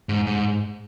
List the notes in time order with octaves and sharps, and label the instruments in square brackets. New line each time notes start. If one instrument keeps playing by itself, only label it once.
[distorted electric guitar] G#2
G#2